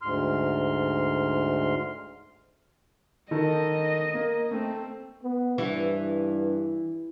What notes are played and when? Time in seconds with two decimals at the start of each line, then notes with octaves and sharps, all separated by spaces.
0.02 D2 G#2 C6 F6
3.31 D#3 D#4 A4 D#5
4.14 A#3
4.51 A3 C4
5.23 B3
5.58 G2 E3